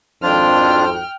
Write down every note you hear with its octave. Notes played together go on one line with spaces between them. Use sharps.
G#1 F2 D4 F4 C5 G5 F6